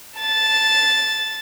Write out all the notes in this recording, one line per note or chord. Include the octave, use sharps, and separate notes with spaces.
A5 A6